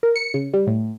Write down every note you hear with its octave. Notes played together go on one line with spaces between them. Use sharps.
A#4
C#7
C#3
G3
A2